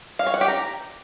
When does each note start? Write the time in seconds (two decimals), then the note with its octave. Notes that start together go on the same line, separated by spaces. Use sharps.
0.19 F5
0.27 C#5
0.34 F#5
0.41 G4
0.48 A#5